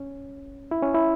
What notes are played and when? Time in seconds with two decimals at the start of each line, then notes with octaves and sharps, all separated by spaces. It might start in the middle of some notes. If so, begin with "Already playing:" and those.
Already playing: C#4
0.71 E4
0.83 C#4
0.95 E4